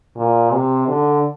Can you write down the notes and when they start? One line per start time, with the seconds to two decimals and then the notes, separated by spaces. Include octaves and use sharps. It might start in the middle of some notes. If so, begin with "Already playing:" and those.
0.17 A#2
0.52 C3
0.88 D3